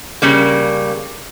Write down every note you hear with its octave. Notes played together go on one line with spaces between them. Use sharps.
C#3 G3 A#3